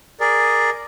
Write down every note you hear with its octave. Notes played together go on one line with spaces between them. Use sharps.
G#4 A#4 D5